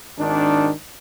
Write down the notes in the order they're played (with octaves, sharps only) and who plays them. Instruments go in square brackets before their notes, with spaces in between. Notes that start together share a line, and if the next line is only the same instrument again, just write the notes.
[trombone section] G#1 D#3 D4